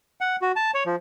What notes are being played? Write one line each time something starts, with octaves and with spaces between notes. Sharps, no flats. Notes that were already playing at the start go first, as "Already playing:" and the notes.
F#5
F#4
A5
C#5
F3